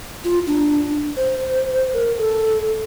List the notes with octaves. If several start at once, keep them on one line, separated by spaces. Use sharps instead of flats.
F4
D4
C5
A#4
A4